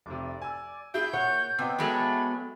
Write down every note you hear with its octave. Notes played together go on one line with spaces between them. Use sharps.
F1 C3 D5
G#5 E6
E4 F#4 G#4 E5 G6
A#2 C#5 F#5
C3 B3 D#5 G5 D6
F#3 G#3 A3 B5